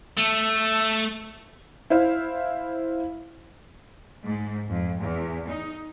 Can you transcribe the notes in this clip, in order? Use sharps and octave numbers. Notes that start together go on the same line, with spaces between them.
A3
E4 C5 F5
G#2
F2
E2
D#4